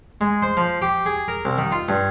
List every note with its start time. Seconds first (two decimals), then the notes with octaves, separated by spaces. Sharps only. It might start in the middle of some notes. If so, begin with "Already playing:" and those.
0.21 G#3
0.42 C5
0.57 F3
0.82 G4
1.06 G#4
1.28 A#4
1.45 C2
1.58 D#3
1.72 F4
1.89 G2